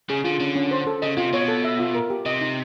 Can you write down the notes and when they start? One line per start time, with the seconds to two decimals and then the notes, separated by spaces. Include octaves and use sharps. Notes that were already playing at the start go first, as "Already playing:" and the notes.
0.09 C#3 G#4
0.24 D3 F4
0.40 D3 C#4
0.55 C#4
0.71 C5
0.87 A4
1.02 C#3 D#5
1.17 C3 F4
1.33 B2 C#5
1.48 A4
1.64 E5
1.79 F4
1.95 A#4
2.10 G4
2.26 C3 D#5
2.41 D#4